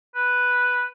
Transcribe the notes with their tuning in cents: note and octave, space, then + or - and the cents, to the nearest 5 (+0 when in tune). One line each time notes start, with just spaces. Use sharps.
B4 +0